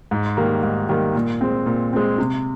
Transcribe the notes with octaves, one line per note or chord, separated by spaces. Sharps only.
G#2
D#3 G3 A#3
G#2
D#3 G3 A#3
A#2
G#3 C4
A#2
G#3 C4
C3